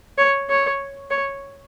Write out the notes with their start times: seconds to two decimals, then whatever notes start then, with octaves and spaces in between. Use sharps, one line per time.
0.18 C#5
0.50 C#5
1.11 C#5